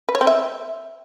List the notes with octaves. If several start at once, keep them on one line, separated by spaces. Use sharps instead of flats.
B4
C#5
C4
E5